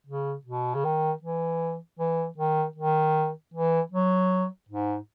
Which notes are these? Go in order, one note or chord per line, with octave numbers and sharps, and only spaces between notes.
C#3
B2
C#3
D#3
E3
E3
D#3
D#3
E3
F#3
G#2